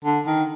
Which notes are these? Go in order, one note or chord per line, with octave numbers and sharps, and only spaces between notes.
D3
D#3